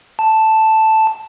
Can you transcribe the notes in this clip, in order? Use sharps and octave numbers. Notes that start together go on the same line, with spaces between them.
A5